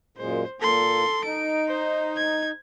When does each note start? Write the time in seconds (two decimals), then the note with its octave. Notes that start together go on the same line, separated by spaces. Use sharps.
0.17 F#2 A#2 G#3 C5
0.61 A#2 A#3 A4 C6
1.24 D#4 D7
1.68 C5
2.16 G#6